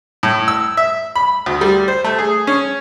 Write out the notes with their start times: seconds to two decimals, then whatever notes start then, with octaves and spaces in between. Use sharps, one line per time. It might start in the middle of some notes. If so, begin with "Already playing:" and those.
0.23 A2
0.48 E6
0.77 E5
1.15 B5
1.46 D2
1.61 G3
1.88 C5
2.04 A3
2.18 G#4
2.47 C#4